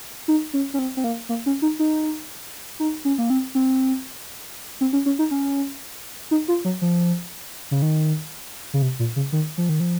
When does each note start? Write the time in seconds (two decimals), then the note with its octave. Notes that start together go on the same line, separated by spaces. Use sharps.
0.28 D#4
0.53 C#4
0.74 C#4
0.79 C4
0.97 C4
1.04 A#3
1.29 A#3
1.46 C#4
1.62 D#4
1.79 D#4
2.80 D#4
3.05 C#4
3.18 A#3
3.30 C4
3.55 C4
4.81 C4
4.93 C#4
5.06 C#4
5.19 D#4
5.31 C#4
6.31 D#4
6.48 F4
6.65 F#3
6.82 F3
7.71 C#3
7.82 D#3
8.74 C#3
8.82 C3
8.99 A#2
9.16 C#3
9.32 D#3
9.58 F3
9.69 D#3
9.80 F3